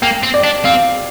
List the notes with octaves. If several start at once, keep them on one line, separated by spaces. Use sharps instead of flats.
A#3 G5
C4
D5
D4
C4 F5